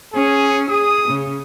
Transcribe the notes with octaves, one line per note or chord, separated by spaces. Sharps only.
C#4 G#4
G#4 D#6
C#3